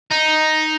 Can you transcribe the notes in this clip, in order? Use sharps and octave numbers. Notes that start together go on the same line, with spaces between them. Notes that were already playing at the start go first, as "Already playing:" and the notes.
D#4